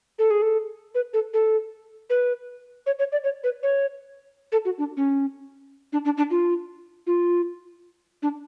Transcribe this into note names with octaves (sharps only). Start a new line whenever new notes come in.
A4
G#4
A4
B4
A4
A4
B4
C#5
C#5
D5
C#5
B4
C#5
A4
F#4
D4
C#4
D4
D4
D4
F4
F4
D4